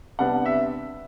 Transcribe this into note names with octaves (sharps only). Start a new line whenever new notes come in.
C3 G3 B3 D4 F#5
E5